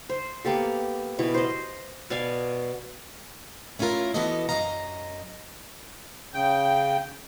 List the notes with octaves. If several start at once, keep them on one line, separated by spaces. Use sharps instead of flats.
C5
A#3 B3 G4 A4
B2 E3
C5 D#5
B2 D5 F5 G#5
A3 C#4 E4 F4 A#4
E3 B3 F#4 A4 B4 D#5
F#2 D#3 D#5 F5 A#5
C#3 G5